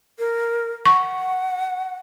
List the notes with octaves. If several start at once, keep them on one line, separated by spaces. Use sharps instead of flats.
A#4
F#5 C#6